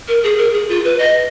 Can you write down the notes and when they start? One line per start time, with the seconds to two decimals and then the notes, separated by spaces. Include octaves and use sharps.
0.08 A#4
0.24 G#4
0.38 A#4
0.54 G#4
0.69 F4
0.85 B4
0.99 D#5